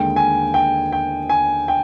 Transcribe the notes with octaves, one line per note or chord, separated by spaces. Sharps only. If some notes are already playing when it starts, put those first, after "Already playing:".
Already playing: D#2 D3 G#3 G5
G#5
G5
G5
G#5
G5